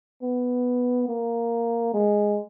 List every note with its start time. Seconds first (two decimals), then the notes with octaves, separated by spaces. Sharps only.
0.23 B3
1.09 A#3
1.94 G#3